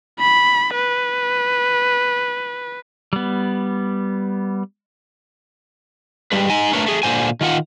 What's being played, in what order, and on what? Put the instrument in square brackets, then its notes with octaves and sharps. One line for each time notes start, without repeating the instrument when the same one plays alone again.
[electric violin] B5
B4
[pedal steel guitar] G3 B3
[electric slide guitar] G3 G#3 B4
D#4 D#5 G#5
A3 D4 A#4 B4 C#5
A3 G#4
A#2 D3 D#3 C5 G#5
D#3 F4 F#5